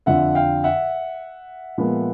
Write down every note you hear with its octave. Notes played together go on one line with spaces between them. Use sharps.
F2 D3 F3 E5 F#5
F5 G5
E5 F#5
A#2 F3 G#3 B3